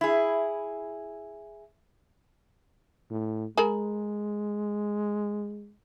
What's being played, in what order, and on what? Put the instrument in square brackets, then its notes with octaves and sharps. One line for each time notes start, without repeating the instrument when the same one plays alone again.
[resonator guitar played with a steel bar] E4 G#4
[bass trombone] A2
[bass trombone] G#3 [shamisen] G#4 A#4 B5